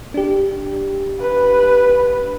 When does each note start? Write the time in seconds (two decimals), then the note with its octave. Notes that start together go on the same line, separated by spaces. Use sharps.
0.14 D4 G4
1.20 B4